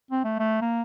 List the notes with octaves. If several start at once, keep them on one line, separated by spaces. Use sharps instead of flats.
C4
A3
A3
A#3